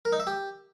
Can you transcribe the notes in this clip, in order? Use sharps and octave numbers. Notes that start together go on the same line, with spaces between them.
A#4
D#4
E5
G4